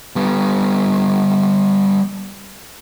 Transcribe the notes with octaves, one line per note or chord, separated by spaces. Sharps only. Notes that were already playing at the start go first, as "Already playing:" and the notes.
G3 B3